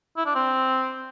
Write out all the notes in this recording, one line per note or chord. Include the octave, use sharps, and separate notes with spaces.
E4
D4
C4